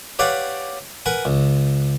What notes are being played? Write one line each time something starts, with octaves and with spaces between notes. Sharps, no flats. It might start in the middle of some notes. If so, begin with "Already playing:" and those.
G4 B4 C#5 D5 F5 F#5
A#4 B4 F#5 G#5
C#2